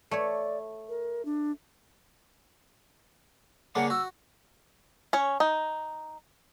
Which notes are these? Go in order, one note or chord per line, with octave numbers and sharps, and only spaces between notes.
A3 C#5 D5
A#4
D4
C#3 A#3 D4 F#5
F#4 E6
C#4 C#5
D#4